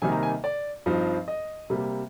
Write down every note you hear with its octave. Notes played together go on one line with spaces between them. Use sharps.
C3 D#3 G3 A#3 D#4 G#5
A#5
G#5
D5
G2 F3 C4 D#4
D#5
C3 G3 A#3